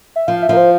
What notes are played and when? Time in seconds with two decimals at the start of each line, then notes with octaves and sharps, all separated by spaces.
0.16 E5
0.27 F3 F5
0.43 E5
0.49 F3 A#4
0.57 C5